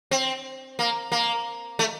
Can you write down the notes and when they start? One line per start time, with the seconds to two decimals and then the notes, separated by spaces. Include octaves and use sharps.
0.11 C4
0.79 A#3
1.12 A#3
1.79 A3